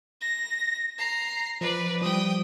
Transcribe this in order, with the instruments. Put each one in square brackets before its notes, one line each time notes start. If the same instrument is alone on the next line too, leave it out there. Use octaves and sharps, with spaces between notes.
[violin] A#6
A#5 C7
[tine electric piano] F3 [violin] B4 D5
[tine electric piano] F3 G3 [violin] G5 D#6